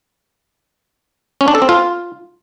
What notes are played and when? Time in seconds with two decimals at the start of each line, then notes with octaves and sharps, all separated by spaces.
1.41 C#4
1.48 D4
1.55 A4
1.62 C4
1.69 F4